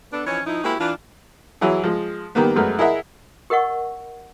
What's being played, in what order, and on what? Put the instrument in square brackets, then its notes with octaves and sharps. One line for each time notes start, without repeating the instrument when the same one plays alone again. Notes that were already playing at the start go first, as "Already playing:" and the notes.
[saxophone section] B3 D4 A4
E3 F3 C4 C#4 D#4 C#5
F3 D#4 E4
G#3 A#3 C4 E4 F#4 G4
E3 D4 F4
[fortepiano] E3 F#3 E4 G#4
F3 G#3
D#3 G3 A#3 B3
F#2 G#3 A3 B4 F6
E4 G#4 A#4 D#5 E5 F#5
[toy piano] G4 A#4 D#5 F#5 C#6